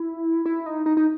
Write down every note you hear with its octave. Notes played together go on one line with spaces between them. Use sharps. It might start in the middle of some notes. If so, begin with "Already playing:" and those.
Already playing: E4
E4
D#4
D#4
D#4